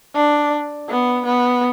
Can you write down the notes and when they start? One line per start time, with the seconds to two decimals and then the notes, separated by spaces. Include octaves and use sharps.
0.15 D4
0.89 B3
1.26 B3